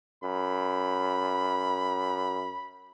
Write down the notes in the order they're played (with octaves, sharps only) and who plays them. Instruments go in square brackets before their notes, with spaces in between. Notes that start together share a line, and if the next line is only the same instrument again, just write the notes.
[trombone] F#2 [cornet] B5